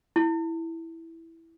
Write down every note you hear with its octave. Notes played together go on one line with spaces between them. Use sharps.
E4